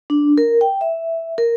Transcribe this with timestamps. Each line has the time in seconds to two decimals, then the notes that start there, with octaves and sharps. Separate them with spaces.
0.10 D4
0.38 A#4
0.61 G5
0.81 E5
1.38 A#4